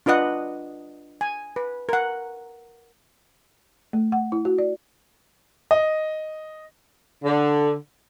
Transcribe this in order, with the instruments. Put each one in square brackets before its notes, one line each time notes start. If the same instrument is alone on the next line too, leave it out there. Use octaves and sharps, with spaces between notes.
[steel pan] D4 F4 B4 D#5 F#5
G#5
B4
A#4 F#5
[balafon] A3
F#5
E4
F#4
D5
[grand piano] D#5
[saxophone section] D3